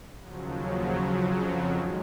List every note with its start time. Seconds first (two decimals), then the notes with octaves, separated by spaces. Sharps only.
0.20 D#2 C#3 F3 F#3
0.96 F2 C#3 F3
1.71 F#2 D#3 G#3